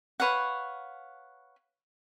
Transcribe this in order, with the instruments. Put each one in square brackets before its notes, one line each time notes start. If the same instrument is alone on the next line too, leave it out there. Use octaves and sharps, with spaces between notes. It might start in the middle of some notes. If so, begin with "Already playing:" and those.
[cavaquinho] B4 C#5 F5 F#5